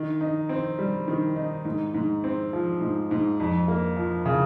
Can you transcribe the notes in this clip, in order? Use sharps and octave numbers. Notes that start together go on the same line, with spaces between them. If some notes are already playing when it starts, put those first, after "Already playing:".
Already playing: D#3
D#4
C4
G3
D#3
D#4
G#2
G#2
C4
F3
G#2
G#2
F2
A#3
F3
C#3